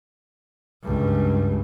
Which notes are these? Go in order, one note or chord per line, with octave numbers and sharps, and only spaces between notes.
C#2 G2